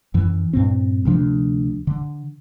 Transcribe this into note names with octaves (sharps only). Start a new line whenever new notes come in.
F#2 E3
G2 A#2 C4
D2 C3 F3 D4
D3